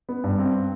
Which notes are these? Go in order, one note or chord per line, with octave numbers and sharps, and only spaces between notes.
B3
G2
C4